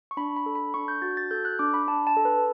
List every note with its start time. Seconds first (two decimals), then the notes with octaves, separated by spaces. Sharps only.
0.11 C#6
0.17 D4 B5
0.36 B5
0.46 A4
0.55 B5
0.74 D4 C#6
0.88 G6
1.02 F#4 A6
1.17 A6
1.31 A4 G6
1.45 F#6
1.59 D4 D6
1.74 B5
1.87 D4 A5
2.07 A5
2.16 A4
2.25 B4